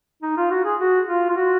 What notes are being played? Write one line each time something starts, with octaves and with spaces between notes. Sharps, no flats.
D#4
F4
F#4
G#4
F#4
F4
F4
F#4